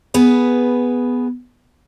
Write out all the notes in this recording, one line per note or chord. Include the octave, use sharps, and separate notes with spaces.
B3 G#4 B4